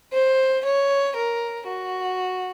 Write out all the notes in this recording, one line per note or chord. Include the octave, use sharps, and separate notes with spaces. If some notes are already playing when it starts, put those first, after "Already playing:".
C5
C#5
A#4
F#4